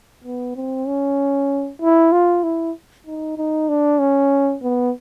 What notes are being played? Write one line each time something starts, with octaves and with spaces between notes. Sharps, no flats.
B3
C4
C#4
E4
F4
E4
D#4
D#4
D4
C#4
B3